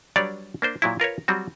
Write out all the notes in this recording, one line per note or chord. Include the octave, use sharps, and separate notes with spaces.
F#3 G3 D4 B4 C#5 D5
A#3 D4 C5
A#2 F#3 E4
F4 A#4 B4 C#5
F#3 G3 C4 F#4